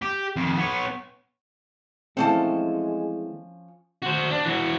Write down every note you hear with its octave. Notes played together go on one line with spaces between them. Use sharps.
G4
F2 D#3
B3 C#5
E3 F3 G#3 A3 C4 C#4 A5
F#4 C5
D4
E3 F#4